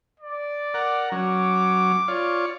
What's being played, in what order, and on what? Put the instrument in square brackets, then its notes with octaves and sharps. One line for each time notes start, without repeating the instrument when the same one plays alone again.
[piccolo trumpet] D5
[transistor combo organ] A#4 F#5
[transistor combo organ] F#3 C#4 [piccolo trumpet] D6
[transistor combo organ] F4 C#5 D5